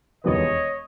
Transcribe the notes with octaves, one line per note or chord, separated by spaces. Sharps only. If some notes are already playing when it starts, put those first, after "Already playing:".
E1 D#2 D#3 G3 B3 C#5 D#5